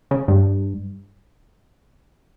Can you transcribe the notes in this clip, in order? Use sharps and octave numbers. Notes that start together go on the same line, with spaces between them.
C#3
G2